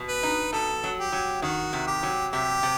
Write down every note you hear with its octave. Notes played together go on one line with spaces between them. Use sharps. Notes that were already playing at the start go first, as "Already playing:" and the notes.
Already playing: B2
B4
D#4
B2 A4
F#3
G4
F#3
D#3 F#4
C3
G4
F#3
C3 G4
C3